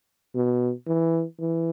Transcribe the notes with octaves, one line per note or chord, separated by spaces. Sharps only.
B2
E3
E3